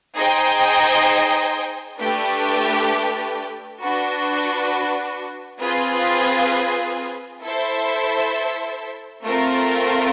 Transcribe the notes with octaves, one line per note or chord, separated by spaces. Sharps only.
D#4 G#4 C5 D#5 G5
A3 D4 G4 B4
D4 F#4 B4
C4 F4 G#4 B4
E4 A4 C5 E5
A3 C4 F4 A#4